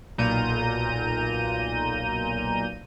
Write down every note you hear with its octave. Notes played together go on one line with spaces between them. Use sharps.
B1 A#2 A#5 G6 D#7